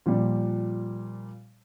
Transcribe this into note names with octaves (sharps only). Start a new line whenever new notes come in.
A#2 F3 G3